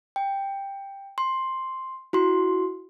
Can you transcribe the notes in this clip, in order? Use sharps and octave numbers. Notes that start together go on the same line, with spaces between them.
G5
C6
E4 F#4 C6